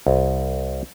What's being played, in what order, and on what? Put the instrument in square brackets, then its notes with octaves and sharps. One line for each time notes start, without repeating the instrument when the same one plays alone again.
[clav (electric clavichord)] C2